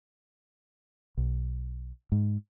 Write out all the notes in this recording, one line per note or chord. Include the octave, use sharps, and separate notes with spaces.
B1
G#2